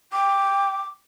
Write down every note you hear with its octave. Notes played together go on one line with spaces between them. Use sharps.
G5 D6